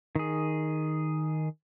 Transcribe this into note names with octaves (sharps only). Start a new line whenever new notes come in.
D#3 G#4